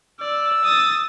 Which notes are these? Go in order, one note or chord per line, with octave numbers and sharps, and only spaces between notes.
D5 E6
D#6 A6